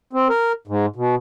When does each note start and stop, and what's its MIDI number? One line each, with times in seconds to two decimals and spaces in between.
0.13 0.28 60
0.30 0.52 70
0.67 0.86 44
0.96 1.15 47